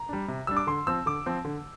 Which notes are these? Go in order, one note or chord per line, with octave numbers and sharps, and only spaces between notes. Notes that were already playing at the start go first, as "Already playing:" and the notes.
Already playing: A#5
G3 D4
C3
G3 D4 E6
D6
D3 C6
F3 C4 E6
D3 D6
F3 C4
D3